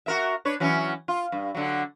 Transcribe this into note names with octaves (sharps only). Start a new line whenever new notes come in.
F#4 A#4 E5
D4 B4 C#5
E3 F#3 C#4
F4
G2
D3 F#3